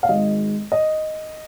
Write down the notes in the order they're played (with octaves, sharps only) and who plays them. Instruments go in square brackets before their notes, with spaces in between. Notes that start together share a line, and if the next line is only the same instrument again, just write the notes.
[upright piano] F5
G#1 G#2 G#3 D#5
D#5